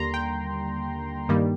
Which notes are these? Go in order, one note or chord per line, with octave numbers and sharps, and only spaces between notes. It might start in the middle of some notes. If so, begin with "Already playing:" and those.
Already playing: D#2 D3 G3 A#3 A#5 C6
G5
G2 D#3 G3 A#3